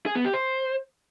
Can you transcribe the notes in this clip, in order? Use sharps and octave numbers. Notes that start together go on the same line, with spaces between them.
G#4
B3
G4
C5